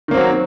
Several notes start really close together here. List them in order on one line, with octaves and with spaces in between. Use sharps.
D#3 A#3 C4 F#3